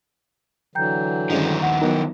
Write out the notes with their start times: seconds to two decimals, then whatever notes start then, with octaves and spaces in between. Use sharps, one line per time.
0.75 D3 E3 F#3 G5 A#5 G6
1.30 G2 D#3 F3 G#3 C#4
1.62 D#2 F#5
1.81 F#3 B3 D#4 A#4 F#5 G5